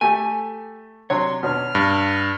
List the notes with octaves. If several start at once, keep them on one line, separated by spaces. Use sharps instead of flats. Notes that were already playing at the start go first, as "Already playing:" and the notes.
A3 G4 A4 G#5
C3 F#3 D4 C#5 C6
B2 C#4 D4 F6
G2